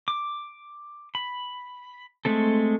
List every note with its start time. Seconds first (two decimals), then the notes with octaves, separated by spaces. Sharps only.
0.08 D6
1.15 B5
2.25 G#3 A3 C4 A4